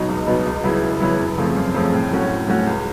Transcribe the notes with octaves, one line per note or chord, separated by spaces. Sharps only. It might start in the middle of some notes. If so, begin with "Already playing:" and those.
Already playing: B2 F#3 B3 D#4
C#2
B2 F#3 B3 D#4
C#2
C#3 F#3 B3 E4
C#2
C#3 F#3 B3 E4
F#2
C#3 F3 A3 C4
F#2
C#3 F3 A3 C4
A2
F#3 A3 C#4 F#4
A2
F#3 A3 C#4 F#4
C#2